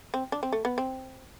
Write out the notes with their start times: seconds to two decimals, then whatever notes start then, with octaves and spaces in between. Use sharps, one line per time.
0.14 C4
0.32 D4
0.43 C4
0.52 A3
0.65 B3
0.78 C4